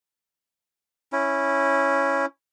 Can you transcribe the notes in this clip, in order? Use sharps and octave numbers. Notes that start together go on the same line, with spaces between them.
C#4 E4